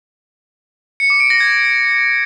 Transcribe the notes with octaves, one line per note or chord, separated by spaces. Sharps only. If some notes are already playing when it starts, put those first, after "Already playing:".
C#7
D6
D7
A#6
G#6